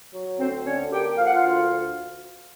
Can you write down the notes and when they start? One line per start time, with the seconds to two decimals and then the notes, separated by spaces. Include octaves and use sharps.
0.13 F#3
0.39 D2 C4 C5
0.65 D3 C#4 C#5
0.91 A#3 G4 G5
1.17 F3 F5
1.25 F#5
1.33 F4 F5
1.43 D2